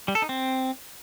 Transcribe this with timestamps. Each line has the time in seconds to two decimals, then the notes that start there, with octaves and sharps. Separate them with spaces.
0.08 G3
0.15 A4
0.22 D#4
0.29 C4